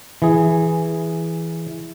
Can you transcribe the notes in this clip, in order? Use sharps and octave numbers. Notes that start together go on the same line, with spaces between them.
E3 G#4